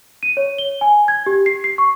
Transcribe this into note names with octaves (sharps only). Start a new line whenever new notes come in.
D#7
C#5
G7
G#5
G#6
G4
C7
C7
C#6